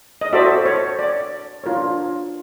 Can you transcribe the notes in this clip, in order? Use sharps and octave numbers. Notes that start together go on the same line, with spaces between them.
D#5
F#4 A4 C5 D5 E5
C#5
D5
D4 F4 A#4 C#5